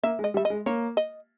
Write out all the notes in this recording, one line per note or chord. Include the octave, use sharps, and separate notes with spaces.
A#3 E5
G#3
D#5
G3
E5
D#5
G#3
A#3 C#5
D#5